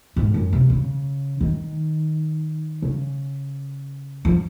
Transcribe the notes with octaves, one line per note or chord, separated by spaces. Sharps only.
G#2
F#2
C3
C#3
D#3
C#3
F3